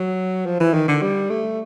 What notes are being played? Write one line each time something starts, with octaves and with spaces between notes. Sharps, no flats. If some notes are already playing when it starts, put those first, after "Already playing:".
Already playing: F#3
F3
E3
D#3
D3
G3
A3